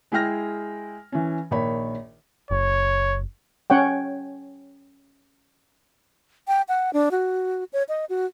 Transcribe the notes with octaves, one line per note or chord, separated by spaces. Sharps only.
G#3 E4 G#4 G5 F6 A#6
E3 C#4
A#1 D#3 C#5 B5
F#1 C#5
C#4 C#5 F#5 G5
G5
F#5
D4
F#4
C#5
D#5
F#4